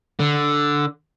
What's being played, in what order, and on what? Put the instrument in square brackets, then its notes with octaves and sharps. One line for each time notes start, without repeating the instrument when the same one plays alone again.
[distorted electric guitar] D3